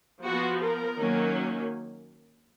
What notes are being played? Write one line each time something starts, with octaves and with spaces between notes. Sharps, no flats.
F3 B3 F#4
A#4
D#3 F#3 A#3 C#4